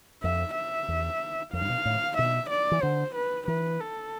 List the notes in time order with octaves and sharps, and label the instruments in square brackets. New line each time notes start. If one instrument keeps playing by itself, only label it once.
[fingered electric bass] F2 [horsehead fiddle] E5
[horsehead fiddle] E5
[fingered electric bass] E2
[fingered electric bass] F2 [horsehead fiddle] F5
[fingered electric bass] G2
B2
A2
[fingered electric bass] B2 [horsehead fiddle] E5
[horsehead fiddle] D5
[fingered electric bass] E3
[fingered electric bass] D3 [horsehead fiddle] C5
[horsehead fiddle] B4
[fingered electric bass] E3 [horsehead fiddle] B4
[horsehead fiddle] A4